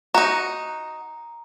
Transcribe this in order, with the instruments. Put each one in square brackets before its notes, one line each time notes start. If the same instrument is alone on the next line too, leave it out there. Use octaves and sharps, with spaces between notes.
[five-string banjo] D#4 F#4 [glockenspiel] A#5